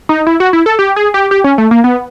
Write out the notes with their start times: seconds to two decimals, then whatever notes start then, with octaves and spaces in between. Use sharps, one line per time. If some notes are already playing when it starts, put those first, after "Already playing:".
0.09 D#4
0.27 E4
0.40 F#4
0.53 E4
0.66 A4
0.79 G4
0.96 G#4
1.14 G4
1.31 G4
1.44 C#4
1.58 A3
1.71 A#3
1.84 B3